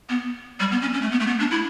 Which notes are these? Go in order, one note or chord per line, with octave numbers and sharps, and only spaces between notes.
B3
G3
B3
C#4
C#4
A3
B3
A3
B3
D4
E4